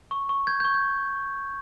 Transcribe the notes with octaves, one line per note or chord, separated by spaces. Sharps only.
C#6
C#6
G6 G#6
G6
C#6
G6